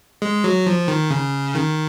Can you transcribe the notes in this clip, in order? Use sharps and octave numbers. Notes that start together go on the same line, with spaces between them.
G#3
F#3
F3
D#3
C#3
D#3